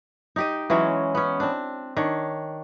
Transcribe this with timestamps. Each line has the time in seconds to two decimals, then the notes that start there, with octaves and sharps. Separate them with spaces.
0.36 D#4 G4 D#5
0.70 E3 F#3 G#3 C#4
1.15 B3 C#4
1.40 C4 D4
1.96 D#3 D4 C#5